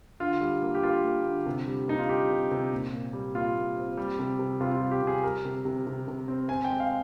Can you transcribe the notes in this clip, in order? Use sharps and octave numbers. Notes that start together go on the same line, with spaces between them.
D3 F4
G3
A#3
G4
A#3 F4
A#3
D3
C3
G3
A#3 D#4
F4
G3 G4
C3
C3
A#2
A#2
G3
A#2 F4
A#2
C4
G3
C3
C3
C3 F4
F4
G3
G4
C3
G#4
G3 A#4
C3
C3
C3
C3
C4
C4 G#5
G5
G#3
F5